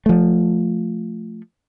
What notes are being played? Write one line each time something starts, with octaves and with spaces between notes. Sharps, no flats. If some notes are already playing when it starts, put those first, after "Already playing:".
F3 A3